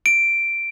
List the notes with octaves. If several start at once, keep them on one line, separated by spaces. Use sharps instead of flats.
D7